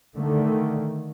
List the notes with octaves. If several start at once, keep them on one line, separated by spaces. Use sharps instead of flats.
D3 D#3 A3